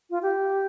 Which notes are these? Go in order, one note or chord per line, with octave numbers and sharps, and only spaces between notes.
F4
G4